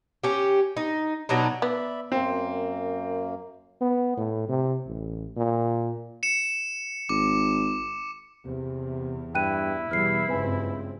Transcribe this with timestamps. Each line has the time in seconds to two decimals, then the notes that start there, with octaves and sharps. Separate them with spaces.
0.24 C#4 G4
0.77 D#4
1.29 B2 F#3 D4 D#4
1.62 B3 D5 E5 B5
2.12 F#2 A#3 C4
3.81 B3
4.17 A2
4.49 C3
4.87 A1
5.37 A#2
6.23 C#7 E7
7.09 G#1 D6
8.45 E2 C3
9.35 G2 E4 G5 F#6 D#7
9.91 E2 B2 G3 F6 C7
10.29 F#1 C#2 G2 C4 B4 G#5